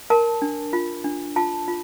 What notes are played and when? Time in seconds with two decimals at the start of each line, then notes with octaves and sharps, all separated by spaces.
0.10 A#4 A5
0.42 D4
0.73 F4
1.04 D4
1.36 F4 A5
1.68 F4